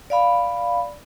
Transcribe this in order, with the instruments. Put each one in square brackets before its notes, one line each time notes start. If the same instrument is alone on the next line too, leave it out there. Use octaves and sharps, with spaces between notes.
[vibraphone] D5 F5 B5